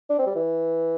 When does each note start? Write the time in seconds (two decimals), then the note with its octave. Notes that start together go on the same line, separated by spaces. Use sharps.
0.10 D4
0.19 C4
0.26 G3
0.35 E3